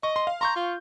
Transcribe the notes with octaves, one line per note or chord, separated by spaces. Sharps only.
D#5 C#6
C6
F5
A#5 C6 C#6 G6
F4